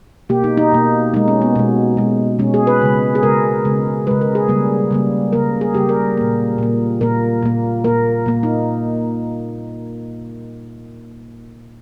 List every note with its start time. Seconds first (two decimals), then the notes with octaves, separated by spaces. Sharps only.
0.29 B2 A#3 G4
0.44 D#4
0.57 D#4
0.72 B2 A#3
1.14 B2 G#3 D#4
1.28 C#4
1.42 B3
1.55 B2 G#3 B3
1.97 B2 G#3
2.39 B2 G#3 C#4
2.54 G#4
2.67 B4
2.82 C#3 G#3
3.15 G#4
3.23 C#3 G#3 A#4
3.65 C#3 G#3
4.07 C#3 G#3 B4
4.21 A#4
4.35 G#4
4.49 C#3 G3 A#3
4.91 C#3 G3 A#3
5.33 C#3 G3 A#3 A#4
5.61 G#4
5.74 C#3 G3 A#3 G4
5.89 A#4
6.17 A#2 A#3
6.58 A#2 A#3
7.01 A#2 A#3 A#4
7.43 A#2 A#3
7.84 A#2 A#3 A#4
8.26 A#2 A#3
8.43 D#4